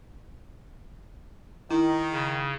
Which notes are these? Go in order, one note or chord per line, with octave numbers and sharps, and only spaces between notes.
D#3 E4
C#3